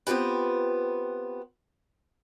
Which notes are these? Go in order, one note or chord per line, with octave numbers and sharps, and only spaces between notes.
B3 C4 F4 G4 B4